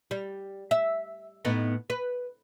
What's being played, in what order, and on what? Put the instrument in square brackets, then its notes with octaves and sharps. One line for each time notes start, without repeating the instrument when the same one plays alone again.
[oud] G3
E5
A2 B3 D#4
B4